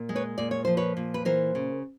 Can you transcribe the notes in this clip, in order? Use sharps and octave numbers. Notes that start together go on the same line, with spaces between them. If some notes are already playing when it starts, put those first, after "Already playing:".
Already playing: A#2
G#3
B4 C#5
A#2 D5
C#5
F3 C5
B4 C#5
A#2
B4
E3 A#4 C5
C#3